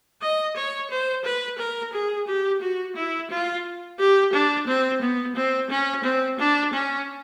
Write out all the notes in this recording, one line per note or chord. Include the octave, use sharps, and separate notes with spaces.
D#5
C#5
C5
B4
A#4
G#4
G4
F#4
E4
F4
G4
D4
C4
B3
C4
C#4
C4
D4
C#4